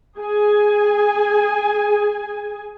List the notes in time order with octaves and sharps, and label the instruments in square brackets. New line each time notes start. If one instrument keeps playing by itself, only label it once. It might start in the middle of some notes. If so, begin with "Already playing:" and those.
[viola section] G#4 G#5